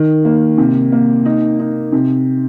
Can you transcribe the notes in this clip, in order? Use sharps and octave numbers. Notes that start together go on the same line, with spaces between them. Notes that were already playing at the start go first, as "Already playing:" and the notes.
Already playing: D#3
A#3
C3
A#3
D#4
D#4
C3